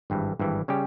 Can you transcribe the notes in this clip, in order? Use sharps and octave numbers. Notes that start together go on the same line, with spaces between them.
G#1 G2 E3
G#1 G2 E3
C#3 G3 C#4 G4